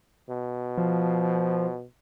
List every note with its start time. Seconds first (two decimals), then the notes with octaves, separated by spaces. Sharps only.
0.30 B2
0.78 F3